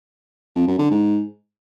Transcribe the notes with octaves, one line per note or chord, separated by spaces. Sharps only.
F2
F#2
D3
G#2